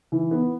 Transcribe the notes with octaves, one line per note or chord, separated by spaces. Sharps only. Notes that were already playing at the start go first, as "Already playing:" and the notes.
E3
B3